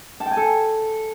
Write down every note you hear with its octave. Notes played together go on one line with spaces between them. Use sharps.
A5
G5
G#5
A4